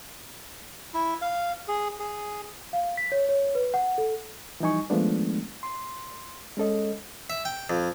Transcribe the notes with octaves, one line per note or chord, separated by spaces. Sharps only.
E4
F5
G#4
G#4
F5
B6
C#5
C#5
B4
F#5
A4
E3 F3 G3 D#4 G#5 C#6
D#3 F3 G#3 A3 B3 D4
C6
G#3 C#4 A4 D#5
E5
G5
F2